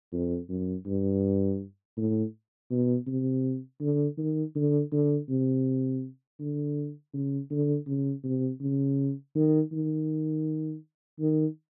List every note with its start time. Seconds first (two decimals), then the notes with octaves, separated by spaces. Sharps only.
0.12 F2
0.49 F#2
0.86 G2
1.97 A2
2.71 B2
3.07 C3
3.81 D3
4.18 D#3
4.56 D3
4.92 D3
5.29 C3
6.40 D3
7.14 C#3
7.51 D3
7.87 C#3
8.24 C3
8.61 C#3
9.35 D#3
9.73 D#3
11.20 D#3